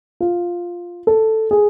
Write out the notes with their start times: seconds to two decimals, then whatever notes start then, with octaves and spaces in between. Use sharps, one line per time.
0.20 F4
1.07 A4
1.51 G#4